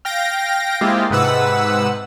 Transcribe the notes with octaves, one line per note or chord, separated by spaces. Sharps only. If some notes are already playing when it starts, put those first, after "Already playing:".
F5 G5 A#6 D7
G#3 A#3 C4 E4 F4 G4
G#2 C3 B4 F#5 E6